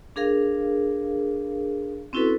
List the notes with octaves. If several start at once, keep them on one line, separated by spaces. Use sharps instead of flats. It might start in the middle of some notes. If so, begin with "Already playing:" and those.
D4 G#4 A#4 F5
C4 C#4 E4 F#4 A4 B4